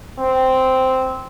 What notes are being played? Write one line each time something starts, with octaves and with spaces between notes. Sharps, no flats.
C4